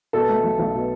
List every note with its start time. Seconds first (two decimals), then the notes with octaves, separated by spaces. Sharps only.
0.13 B2 A4
0.29 A3
0.44 B1
0.59 B1
0.74 B2